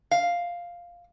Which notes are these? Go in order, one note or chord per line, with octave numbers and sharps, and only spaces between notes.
F5